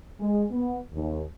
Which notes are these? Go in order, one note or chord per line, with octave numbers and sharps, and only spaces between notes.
G#3
B3
D#2